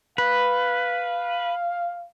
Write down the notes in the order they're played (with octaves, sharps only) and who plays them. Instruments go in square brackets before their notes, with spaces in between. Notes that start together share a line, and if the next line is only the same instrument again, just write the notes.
[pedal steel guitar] B4 [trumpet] F5